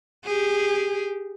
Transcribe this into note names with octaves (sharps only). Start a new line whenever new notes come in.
G4 G#4